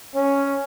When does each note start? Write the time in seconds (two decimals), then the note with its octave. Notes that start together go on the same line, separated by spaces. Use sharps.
0.15 C#4